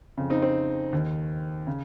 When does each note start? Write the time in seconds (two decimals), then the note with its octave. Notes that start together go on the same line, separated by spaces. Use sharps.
0.17 F2 C#3
0.30 C4 D#4
0.42 C4
0.93 D#2 D#3
1.67 C#3